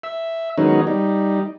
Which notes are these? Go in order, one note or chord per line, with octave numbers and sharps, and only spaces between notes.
E5
D#3 F#3 G#3 B3 C#4 D#4
G3 D#4